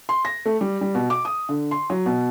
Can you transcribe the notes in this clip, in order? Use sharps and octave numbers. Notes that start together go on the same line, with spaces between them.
C6
A#6
A3
G3
G3
B2
D6
D#6
D3
C6
F#3
B2